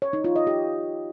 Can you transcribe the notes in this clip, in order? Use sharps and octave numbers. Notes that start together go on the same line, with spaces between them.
C#5
D#4
F4
D#5
G4